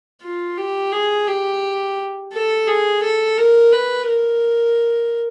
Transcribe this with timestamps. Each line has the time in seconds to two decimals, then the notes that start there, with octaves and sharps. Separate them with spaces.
0.22 F4
0.57 G4
0.92 G#4
1.27 G4
2.33 A4
2.68 G#4
3.03 A4
3.38 A#4
3.73 B4
4.08 A#4